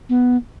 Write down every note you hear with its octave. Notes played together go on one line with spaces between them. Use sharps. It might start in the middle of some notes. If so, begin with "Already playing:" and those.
B3